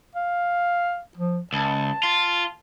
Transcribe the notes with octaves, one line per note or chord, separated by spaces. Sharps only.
F5
F3
C#2 A5
F4